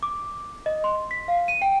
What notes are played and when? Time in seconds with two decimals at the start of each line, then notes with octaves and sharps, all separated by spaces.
0.03 D6
0.66 D#5
0.84 C6
1.11 B6
1.28 F5
1.48 D#7
1.62 G5